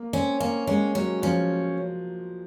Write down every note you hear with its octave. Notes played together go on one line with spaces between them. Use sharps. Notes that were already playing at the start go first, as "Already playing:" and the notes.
Already playing: A#3
C4 C#4
A#3 C#4
G#3 C#4
F#3 C#4
F3 C#4